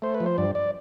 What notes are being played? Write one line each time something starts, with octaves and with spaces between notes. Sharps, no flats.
A3 C5
B4
F3
C5
G2 D5
D5